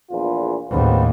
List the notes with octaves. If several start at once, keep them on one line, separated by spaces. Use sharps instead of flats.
A#1 E2 F4
D#2 A2 C#3 B3 C4